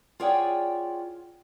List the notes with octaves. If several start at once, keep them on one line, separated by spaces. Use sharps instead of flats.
F4 G#4 C#5 D5 F#5 G5